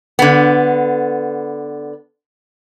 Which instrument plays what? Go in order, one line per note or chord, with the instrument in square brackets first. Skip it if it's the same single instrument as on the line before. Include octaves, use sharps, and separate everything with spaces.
[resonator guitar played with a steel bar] D3 B3